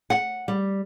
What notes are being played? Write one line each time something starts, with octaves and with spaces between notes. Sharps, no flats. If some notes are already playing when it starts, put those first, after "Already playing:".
F#5
G3